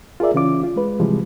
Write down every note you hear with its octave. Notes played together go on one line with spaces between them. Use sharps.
F4 G#4 A#4 D5 E5
C#3 E3 C#4 F4 D6
F4
G#3 B4
C3 E3 F3 G3 G#3